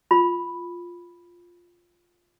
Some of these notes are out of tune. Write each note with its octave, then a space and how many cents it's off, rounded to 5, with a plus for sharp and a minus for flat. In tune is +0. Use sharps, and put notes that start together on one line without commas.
F4 +0 B5 +0